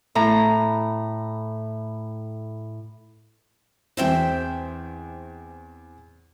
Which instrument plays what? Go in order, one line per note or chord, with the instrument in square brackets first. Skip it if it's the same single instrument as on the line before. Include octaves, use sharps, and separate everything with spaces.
[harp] A2 A#5
[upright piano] E2 C4 [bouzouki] C5 E5 G5